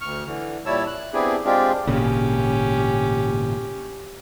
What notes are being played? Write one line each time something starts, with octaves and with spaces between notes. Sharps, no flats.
D2 C#6 F6
D3 E3
A#2 G3 E4 C#5 A5 E6
F#6
B3 C4 D4 E4 G4 G#4
G#3 C4 D4 F4 G4
G#1 A#2 C#3 C#4 G4